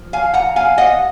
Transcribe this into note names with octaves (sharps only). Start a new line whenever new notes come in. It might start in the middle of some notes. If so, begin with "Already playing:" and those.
Already playing: F3
F5 G#5
F#5 A#5
F5 G#5
D#5 F#5